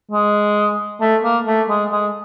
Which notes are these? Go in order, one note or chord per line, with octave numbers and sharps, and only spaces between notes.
G#3
A3
A#3
A3
G#3
G#3